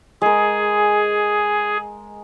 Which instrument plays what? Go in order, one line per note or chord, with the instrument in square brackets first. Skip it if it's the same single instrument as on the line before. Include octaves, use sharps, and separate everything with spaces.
[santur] G#3 A#4 [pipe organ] G#4